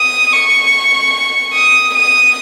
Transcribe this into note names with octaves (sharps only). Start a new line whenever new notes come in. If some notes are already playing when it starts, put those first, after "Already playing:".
Already playing: D#6
C#6
D#6
D#6